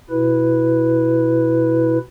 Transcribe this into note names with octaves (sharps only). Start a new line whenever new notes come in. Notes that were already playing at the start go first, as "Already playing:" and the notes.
B2 E4 B4